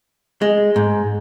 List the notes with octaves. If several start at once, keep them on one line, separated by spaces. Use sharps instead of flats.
G#3
G#2